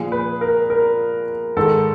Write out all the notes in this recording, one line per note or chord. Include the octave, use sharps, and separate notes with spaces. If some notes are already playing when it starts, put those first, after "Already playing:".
Already playing: A#2 F3 G#4
B4
A#4
A#4
G#2 D#3 A4